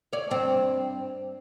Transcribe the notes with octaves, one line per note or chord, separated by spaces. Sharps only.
C#5 D5
G2 C4